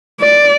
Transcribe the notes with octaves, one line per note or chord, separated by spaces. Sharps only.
D5